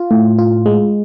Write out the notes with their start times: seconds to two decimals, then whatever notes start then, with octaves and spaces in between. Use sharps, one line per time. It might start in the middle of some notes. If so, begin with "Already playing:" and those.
Already playing: F4
0.11 A2
0.38 F4
0.66 G#3